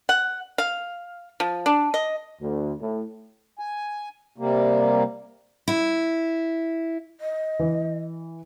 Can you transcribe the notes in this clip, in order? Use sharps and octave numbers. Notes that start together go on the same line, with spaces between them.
F#5
F5
F3
D4
D#5
D2
A2
G#5
C3 G3 A#3
E4
D#5
E3